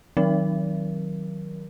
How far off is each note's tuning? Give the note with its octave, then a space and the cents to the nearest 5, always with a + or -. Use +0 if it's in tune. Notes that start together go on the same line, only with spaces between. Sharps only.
D#3 +15 F#3 -5 A#4 +20